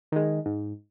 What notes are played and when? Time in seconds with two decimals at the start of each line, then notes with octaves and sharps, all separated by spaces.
0.12 D#3 G#3
0.46 G#2